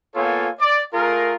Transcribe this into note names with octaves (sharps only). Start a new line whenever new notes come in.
A#3 B3 F4 A4 C#5 G#5
D5
A3 F4 G#4 A#4